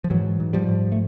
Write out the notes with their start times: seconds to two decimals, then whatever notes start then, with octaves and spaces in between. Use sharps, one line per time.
0.04 F3
0.10 G#2 E3 F#3
0.40 G#2
0.53 F3 G3
0.68 G#2
0.92 A3